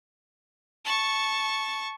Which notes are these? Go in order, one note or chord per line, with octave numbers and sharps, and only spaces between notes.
A5 C#6